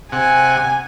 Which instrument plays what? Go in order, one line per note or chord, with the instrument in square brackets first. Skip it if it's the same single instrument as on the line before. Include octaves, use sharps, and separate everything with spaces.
[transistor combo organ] C3 F#5 [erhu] G#5